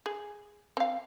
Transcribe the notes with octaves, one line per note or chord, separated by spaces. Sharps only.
G#4
C4 F5